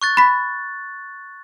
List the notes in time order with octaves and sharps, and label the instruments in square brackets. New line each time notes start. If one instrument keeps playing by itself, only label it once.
[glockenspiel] C#6 F#6 A6
[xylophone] B5 B6